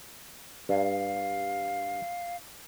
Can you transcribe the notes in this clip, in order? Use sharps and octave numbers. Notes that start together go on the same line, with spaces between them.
G2 F5